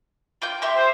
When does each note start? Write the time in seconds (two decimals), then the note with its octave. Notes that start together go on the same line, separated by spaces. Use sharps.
0.42 F4 G5 G6
0.62 G4 E5 C6
0.77 C5